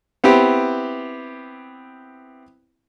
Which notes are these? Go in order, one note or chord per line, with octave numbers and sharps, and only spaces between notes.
B3 C4 E4 G4